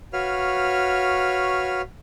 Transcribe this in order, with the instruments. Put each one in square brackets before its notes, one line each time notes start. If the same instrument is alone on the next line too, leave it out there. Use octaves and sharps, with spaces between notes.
[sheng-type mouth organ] F#4 B4 C#5 F5 F6